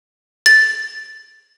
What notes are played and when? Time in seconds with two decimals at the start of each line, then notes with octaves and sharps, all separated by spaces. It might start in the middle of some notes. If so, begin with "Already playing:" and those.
0.46 A6